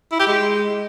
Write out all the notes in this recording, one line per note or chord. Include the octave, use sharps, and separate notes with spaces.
E4
G4
G#3